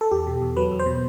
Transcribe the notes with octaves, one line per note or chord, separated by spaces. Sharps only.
A4
E2 G4
B2
E2
F#3 B4
E2
C5
B2